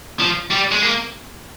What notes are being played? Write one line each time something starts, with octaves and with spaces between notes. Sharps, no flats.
F3
G3
G#3
A#3